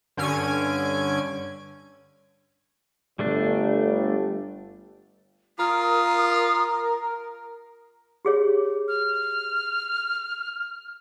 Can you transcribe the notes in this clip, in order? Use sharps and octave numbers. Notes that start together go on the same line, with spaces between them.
G2 D3 C#4 G#5 G#6 D7
G1 G3 A3 D4
F4 A#4 D#6
G4 G#4 C#5
F6